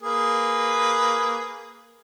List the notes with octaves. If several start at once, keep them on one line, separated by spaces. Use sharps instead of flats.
A#3 G#4 B4